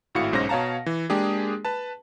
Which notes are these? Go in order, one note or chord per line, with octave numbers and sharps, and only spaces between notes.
G#1 A2 E4 F#4 F5 C#7
B1 G#2 C#4 C5 A#6
B2 C#5 F5 A5 A#5
E3
G#3 A#3 D4 G4 G#4
B4 A5